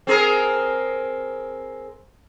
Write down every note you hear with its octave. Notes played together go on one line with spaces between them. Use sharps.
C4 G#4 A#4